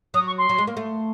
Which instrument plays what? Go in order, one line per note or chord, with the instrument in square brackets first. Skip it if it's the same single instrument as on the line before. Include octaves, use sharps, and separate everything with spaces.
[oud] F#3 [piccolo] D#6
[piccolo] C#6
C6
[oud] F#3
G#3
A#3
A3